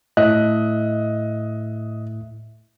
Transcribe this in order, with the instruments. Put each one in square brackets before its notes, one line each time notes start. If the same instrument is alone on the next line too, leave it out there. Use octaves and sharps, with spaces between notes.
[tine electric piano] A2 E5 F#6 [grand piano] D#5